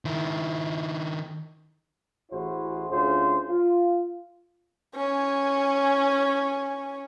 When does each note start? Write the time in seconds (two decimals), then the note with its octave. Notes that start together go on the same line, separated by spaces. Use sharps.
0.05 D#3 E4
2.31 A1 E4 F#4 G#4 C5
2.90 D2 C#4 F4 G#4 C5
3.49 F4
4.95 C#4 G#5